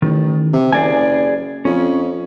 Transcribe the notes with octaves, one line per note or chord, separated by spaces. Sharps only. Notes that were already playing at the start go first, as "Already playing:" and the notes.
A1 D#3
C3
F#1 G#4 D5 G#5
F2 C#4